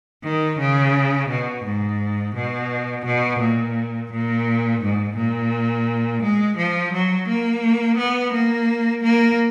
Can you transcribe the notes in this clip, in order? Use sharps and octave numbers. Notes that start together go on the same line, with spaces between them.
D#3
C#3
B2
G#2
B2
B2
A#2
A#2
G#2
A#2
G#3
F3
F#3
A#3
B3
A#3
A#3